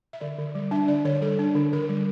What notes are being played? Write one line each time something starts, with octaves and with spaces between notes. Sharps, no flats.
E5
D3 D5
D3
G3
D4 E5
D3 D5
D3 C#5
G3 A4
D4
D3
D3 A#4
G3